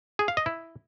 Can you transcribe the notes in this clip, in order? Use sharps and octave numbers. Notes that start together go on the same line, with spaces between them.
G#4
F5
D#5
E4